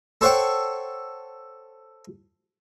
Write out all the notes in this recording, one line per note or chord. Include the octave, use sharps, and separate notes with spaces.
A4 C5 C#5 F#5 G5 C#6